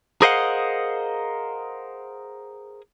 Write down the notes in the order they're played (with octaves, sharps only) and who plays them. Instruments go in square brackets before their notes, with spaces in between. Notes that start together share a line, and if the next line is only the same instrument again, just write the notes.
[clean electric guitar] G#4 A#4 C5 D#5 F5 F#5